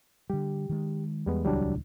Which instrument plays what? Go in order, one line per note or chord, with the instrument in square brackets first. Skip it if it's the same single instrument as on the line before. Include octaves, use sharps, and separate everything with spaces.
[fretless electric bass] D3 G3 [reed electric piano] G4
[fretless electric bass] D#3 G#3
[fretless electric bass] E2 [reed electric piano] G3 G#3 B3
[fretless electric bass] D#1 C#2 E3 [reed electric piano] F#3 G3 D4